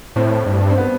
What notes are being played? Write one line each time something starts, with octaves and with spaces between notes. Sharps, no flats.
A2 C4
G2
C4
B3